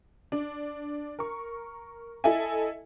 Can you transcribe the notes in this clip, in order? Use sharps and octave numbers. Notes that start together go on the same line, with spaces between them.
D4
A#4 C#6
E4 A4 D#5 E5 G#5